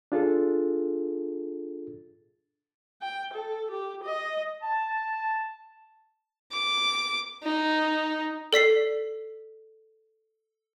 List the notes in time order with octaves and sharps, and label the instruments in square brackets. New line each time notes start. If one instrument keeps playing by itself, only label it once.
[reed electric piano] D4 F4 G#4 A4
[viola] G5
A4
G4
D#5
[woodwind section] A5
[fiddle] D6
D#4
[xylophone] A4 D5 B6 C7